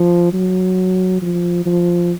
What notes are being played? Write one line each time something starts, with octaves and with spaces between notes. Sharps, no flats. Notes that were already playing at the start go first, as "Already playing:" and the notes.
Already playing: F3
F#3
F3
F3